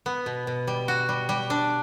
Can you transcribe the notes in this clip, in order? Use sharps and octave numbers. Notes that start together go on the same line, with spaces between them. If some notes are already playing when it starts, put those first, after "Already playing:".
B3
B2
B2
G3
F#4
G3
G3
D4